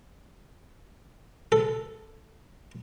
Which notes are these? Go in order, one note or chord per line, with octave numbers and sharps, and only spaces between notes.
A4